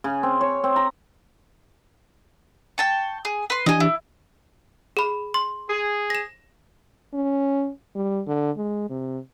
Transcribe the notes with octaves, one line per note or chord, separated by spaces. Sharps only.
C#3
C4
C#5
C4
A#5
G5 A5 C#6
G#4
B4 C6
E3 D4 G4 D#5 G#5
E4
G#4 B5
C6
G#4
A#6 E7
C#4
G3
D3
G#3
C3